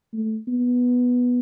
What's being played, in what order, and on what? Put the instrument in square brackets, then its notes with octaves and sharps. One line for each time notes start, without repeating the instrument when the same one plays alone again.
[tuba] A3
B3